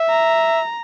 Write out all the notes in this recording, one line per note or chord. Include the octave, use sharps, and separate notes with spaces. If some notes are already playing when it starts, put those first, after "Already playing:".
Already playing: E5
A#5